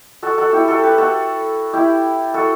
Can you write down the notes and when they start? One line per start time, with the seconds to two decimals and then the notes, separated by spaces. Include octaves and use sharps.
0.23 F#4 A4
0.38 F#4 A4
0.53 E4 G4
0.68 F#4 A4
0.83 G4 B4
0.98 F#4 A4
1.73 E4 G4
2.34 F#4 A4